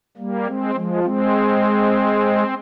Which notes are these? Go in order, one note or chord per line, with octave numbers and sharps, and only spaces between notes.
G3 A#3
G#3 C4
F3 G#3
G#3 C4